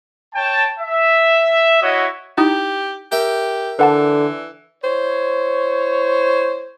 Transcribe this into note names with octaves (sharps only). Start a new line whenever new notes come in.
C#5 G5 A5
E5
E4 F#4 C#5 D#5 E5
D#4 E4 G4 D#6
G4 A#4 E5 G5
D3 E3 B4 F#5 A5
E4 C5 C#5